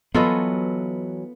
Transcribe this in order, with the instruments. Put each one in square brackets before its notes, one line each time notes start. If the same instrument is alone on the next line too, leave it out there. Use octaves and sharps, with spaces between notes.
[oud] E3 F#3 B4 [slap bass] B3 [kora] F4 A4 D#5